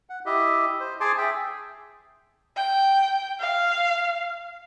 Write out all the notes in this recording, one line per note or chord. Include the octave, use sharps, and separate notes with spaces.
F#5
E4 G4 D#5 E5
C5
G#4 G#5 A5 C6 D6
G#4 E5 G5
G5
F5